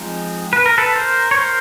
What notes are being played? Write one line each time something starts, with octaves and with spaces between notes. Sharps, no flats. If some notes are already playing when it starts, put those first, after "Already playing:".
Already playing: F3 G#3 C4 D#4
B4
A#4
A4 B4
A#4 C5
C#5
A#4 C5